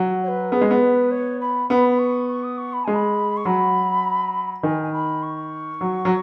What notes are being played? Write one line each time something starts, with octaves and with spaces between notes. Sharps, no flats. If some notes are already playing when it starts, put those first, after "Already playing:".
Already playing: F#3
C#5
B4
B3 G#4
G#3
B3
B4
C#5
B5
B3 B5
B5
C#6
C#6
D#6
C#6
B5
G#3 G#5
B5
C#6
F#3 B5
D#3 G#5
G#5
B5
C#6
F#3
F#3